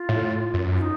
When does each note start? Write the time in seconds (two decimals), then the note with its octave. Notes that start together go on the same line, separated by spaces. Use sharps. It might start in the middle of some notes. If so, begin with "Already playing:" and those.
Already playing: F4
0.09 A2
0.54 F#2
0.77 F4
0.81 D#4